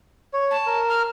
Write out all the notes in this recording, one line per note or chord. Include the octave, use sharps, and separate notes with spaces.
C#5
A5
A#4
F6